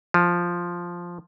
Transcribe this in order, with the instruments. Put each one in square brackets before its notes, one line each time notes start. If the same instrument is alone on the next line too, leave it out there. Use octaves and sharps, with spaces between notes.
[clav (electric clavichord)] F3